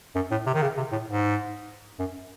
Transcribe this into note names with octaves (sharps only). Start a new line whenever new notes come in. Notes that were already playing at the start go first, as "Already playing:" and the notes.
F#2
A2
C3
D#3
C#3
C3
A2
G#2
F#2